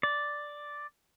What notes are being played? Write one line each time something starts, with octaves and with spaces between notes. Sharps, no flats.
D5